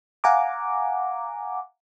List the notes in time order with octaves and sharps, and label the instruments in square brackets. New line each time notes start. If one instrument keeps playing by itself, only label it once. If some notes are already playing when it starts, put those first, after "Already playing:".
[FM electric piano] F5 F#5 G#5 A#5 D6